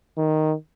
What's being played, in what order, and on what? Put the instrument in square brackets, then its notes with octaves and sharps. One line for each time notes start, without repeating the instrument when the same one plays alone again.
[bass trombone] D#3